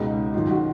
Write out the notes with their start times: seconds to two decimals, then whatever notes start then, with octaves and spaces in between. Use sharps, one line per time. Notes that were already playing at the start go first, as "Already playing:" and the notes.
Already playing: C#2 B2 D#4
0.34 F#2 D#3 F4
0.50 F#4